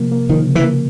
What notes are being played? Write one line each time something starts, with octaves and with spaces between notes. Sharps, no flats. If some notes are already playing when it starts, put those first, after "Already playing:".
Already playing: C3 F3 A#3
A#3
D#3 F3
C#3
E3
A#3